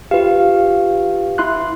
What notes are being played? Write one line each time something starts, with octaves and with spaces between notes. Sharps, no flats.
F4 G4 B4 F5
E4 C6 F#6